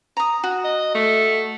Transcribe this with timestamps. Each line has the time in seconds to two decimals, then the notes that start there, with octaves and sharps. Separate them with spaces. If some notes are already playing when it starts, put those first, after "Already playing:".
0.17 A#5 D#6
0.44 F#4
0.64 D#5
0.94 A3